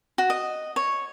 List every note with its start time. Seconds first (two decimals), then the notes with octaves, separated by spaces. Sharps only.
0.18 F#4
0.30 D#5
0.76 C#5